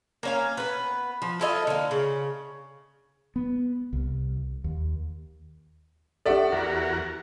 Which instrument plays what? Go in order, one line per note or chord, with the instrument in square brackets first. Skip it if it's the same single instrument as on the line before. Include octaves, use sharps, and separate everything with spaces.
[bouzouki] A#3 C#4 F5
B3 B4
F3
E4 F4 A4 D#5
D3 A#3
C#3
[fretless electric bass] B3
C2
D#2
[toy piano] C#4 G4 A4 [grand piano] D5 E5 F#5
[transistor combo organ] E2 F#4 A#4